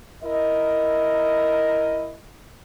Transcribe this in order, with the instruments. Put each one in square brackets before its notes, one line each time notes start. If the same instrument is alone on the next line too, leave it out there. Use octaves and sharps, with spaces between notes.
[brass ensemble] E4 A#4 D#5